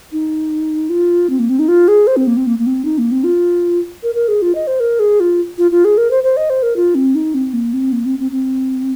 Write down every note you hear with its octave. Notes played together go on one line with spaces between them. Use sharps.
D#4
F4
C4
A#3
C4
D#4
F4
G#4
C5
C4
A#3
C4
A#3
A#3
C4
D#4
A#3
C4
F4
A#4
A#4
G#4
F4
D#5
C5
A#4
G#4
F4
F4
F4
G#4
A#4
C5
C5
D#5
C5
A#4
F4
C4
D#4
C4
A#3
C4
A#3
C4
C4
C4